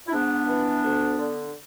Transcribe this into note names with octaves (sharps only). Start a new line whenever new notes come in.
E4
G#2 B3 D4
E3
D2
D3